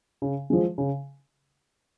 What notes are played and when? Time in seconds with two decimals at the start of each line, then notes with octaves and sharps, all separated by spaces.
0.22 C#3
0.50 F3 G#3
0.78 C#3